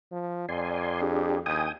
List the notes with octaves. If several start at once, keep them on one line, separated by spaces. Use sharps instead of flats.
F3
F2 D5 G#5 C6
D4 G4 G#4
D#2 G5 G#5 D#6